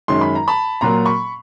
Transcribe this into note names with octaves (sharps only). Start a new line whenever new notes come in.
F#2 D#3 G#3 C#4 C6
B5
A#5
A5 B5
A#2 F#3 A#3 A#5 C6
B5 C#6